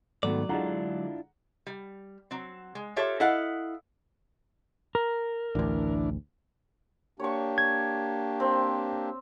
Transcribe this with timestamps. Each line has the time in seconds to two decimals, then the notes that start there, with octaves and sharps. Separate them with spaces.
0.23 G#2 D#3 F#3 A3 B3 F#4 D5
0.49 D3 G#3 D4 E4 F4 F#5 A#5
1.67 G3
2.31 F#3 C4
2.75 G#3
2.96 F4 G4 A4 C#5 E5
3.20 E4 A4 D#5 F5 F#5
4.95 A#4
5.55 A1 D2 E3 D4
7.20 A#3 D4 G4 C#5 C#6
7.58 G#6
8.40 C4